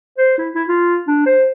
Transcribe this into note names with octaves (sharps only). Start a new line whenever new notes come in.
C5
E4
E4
F4
D4
C5